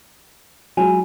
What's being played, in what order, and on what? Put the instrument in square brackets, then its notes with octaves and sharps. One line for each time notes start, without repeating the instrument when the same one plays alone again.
[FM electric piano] F#3 G#3 [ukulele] E4 F4 G#5